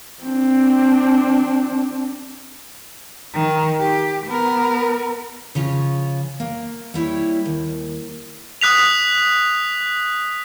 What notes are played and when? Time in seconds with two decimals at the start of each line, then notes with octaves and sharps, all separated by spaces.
0.23 C4 D4
3.34 D#3
3.80 G4
4.26 B3 A#4
5.55 C#3 F3 C#4 F4 C#5 G#5
6.40 A#3
6.94 G3 E4 C#5 G5
7.46 D#2
8.61 D#6 F#6 B6 F7